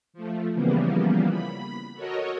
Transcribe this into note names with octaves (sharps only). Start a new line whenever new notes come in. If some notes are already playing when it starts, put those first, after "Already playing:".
F3 A3
C#3 E3 F3 G3 A#3 B3
B5
F#4 A4 A#4 C#5 D#5